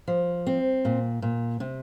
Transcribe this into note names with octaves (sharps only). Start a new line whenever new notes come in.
F3
C4
A#2
A#2
C3